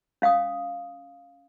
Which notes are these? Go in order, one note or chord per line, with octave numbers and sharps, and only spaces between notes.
C#4 F5 G5 D#6